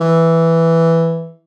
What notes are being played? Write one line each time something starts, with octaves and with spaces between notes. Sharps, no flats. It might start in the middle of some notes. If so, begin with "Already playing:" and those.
E3